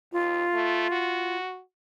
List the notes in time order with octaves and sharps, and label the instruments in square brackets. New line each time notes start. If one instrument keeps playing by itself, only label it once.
[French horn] D#2 [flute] F4
[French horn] A3
F#4